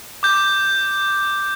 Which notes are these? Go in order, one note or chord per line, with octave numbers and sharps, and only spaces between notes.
D6 G6